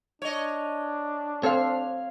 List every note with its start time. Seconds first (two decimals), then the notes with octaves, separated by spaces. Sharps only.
0.22 D4 C#5 D#5
1.43 C4 A4 C5 C#5 F5